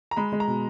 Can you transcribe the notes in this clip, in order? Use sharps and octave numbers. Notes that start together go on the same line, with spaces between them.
A#5
G#3 B5
G#3
A#5
B2